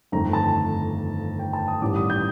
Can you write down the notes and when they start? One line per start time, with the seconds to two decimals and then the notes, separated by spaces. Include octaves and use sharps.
0.12 G1 F2 D#3 A3 A#5
0.33 A5
1.39 G5
1.53 A5
1.68 D#6
1.81 A1 G2 D#3 G3 D6
1.96 D#6
2.10 G6